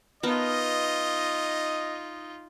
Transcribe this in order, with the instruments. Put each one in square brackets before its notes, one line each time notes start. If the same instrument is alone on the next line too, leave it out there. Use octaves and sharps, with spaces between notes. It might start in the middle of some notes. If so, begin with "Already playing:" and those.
[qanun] B3 A#4 A5 [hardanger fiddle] D#4 F4 [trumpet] D#5